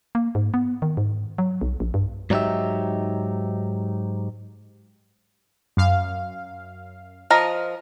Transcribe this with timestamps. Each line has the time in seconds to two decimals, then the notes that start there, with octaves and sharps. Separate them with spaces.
0.15 A#3
0.35 G#2
0.54 B3
0.82 D#3
0.97 G#2
1.38 F#3
1.61 B1
1.80 A#1
1.94 G2
2.30 G#2 F#3 D4 D#4 G4 E5
5.77 F#2 F5
7.30 F3 A#4 D#5